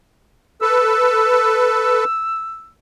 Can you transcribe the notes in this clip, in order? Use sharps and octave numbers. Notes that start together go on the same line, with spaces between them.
A4 B4 E6